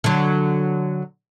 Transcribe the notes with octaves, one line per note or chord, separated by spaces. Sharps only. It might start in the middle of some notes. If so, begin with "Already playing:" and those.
D3 F#3